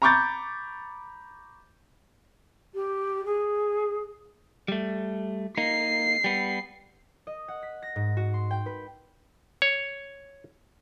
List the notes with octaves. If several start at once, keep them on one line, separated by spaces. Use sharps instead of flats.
A#5 B5 C#6 D6 G6 A6
G4
G#4
G3 A3
A#3 D#4 C7
G3 B3
D#5
F#5
B6
A#6
G#2
F#4
C6
G5
B4
C#5